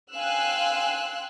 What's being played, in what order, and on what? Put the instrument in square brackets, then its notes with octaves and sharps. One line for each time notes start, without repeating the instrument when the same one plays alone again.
[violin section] F5 G5 G#5 C6 E6 F#6